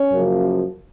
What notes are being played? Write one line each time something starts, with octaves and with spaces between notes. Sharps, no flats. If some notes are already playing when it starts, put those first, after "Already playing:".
Already playing: C#4
F#2 C#3 F3 A#3